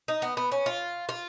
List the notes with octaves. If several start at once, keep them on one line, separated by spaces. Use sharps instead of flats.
D#4
B3
B3
C#4
F4
F4